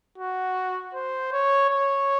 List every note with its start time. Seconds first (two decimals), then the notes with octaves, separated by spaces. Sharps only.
0.18 F#4
0.94 C5
1.32 C#5
1.70 C#5